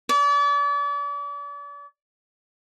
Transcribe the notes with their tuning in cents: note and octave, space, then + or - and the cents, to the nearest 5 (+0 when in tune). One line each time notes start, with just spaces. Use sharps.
D5 -40